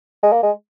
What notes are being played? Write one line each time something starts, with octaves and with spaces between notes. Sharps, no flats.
G#3
A#3
G#3